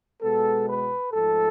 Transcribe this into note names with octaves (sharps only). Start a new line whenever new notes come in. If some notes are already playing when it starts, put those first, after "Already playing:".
B2 G#3 B3 A4
B4
G#2 F3 A3 A4